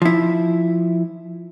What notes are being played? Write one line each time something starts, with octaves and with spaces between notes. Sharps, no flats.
F3 E4